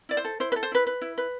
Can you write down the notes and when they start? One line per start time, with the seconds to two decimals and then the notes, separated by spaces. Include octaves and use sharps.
0.09 E4 D5
0.17 C5
0.25 A4
0.40 E4 C5
0.52 B4
0.56 A4
0.63 C5
0.72 E4 B4
0.87 B4
1.02 E4
1.18 B4